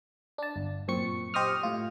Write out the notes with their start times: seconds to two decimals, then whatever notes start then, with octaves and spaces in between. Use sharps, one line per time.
0.38 D4 A5
0.56 G1
0.88 F#2 A#2 C4 C#6 C#7
1.34 G4 C5 D#5 C#6 D#6 F6
1.63 A2 F4